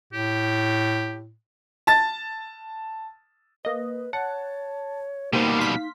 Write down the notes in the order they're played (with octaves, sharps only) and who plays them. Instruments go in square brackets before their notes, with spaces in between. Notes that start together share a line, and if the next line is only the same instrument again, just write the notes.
[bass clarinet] A2 [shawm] G4
[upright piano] A5 A6
[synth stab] A#3 D#5 [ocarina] B4
[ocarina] C#5 [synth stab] F#5 [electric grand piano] A5
[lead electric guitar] B2 G3 [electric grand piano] A#3 [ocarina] D#4 [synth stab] G4 C5
[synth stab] F5 B6 [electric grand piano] C6